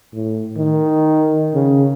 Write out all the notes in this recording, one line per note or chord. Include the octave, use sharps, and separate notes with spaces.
A2
D#3
C#3